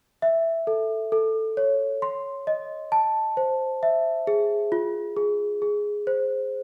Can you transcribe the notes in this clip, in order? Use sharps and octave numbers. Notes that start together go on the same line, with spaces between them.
E5
A4
A4
C#5
C6
D#5
A5
C5
E5
G#4
F4
G#4
G#4
C5